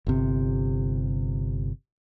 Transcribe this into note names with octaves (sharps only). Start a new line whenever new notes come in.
G1 C3